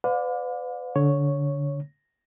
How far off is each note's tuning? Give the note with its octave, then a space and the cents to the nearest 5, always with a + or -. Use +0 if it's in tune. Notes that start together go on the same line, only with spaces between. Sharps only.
B4 +35 D5 +0 F5 +45
D3 -20 C#5 +0